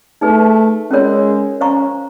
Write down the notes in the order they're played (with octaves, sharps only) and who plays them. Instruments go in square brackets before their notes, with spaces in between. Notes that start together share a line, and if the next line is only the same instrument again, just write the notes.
[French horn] A3 [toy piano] D#4 G#4 B4
[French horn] G#3 [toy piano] C#4 F4 A#4 C#5
[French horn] C#4 [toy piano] C5 F5 A#5 C#6